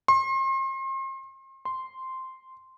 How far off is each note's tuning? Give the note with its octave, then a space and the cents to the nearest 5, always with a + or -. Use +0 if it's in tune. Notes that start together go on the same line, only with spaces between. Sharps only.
C6 +40
C6 -5